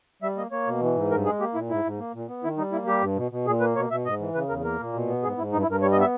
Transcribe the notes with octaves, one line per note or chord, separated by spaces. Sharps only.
G3 E5
A#3 D#5
A#3 C#5
B2
E3
G#2
G2 A#4
G#3 G#4
A#3 G4
A#2 E4
G#2 E4
G#2
A#3
A#2
B3
D#3 E4
G3 D#4
A#3 E4
G3 G4
G2
B2
B2
A#2 G#4
A#3 B4
B2 C#5
B2 E5
G#2 D#5
E3
C#3 B4
E2 A#4
A#3 A#4
A#2
B2
B3
G#2 G#4
G#2 E4
G2 D#4
E4
G2 A#4
G3 C#5
D#5
B3 E5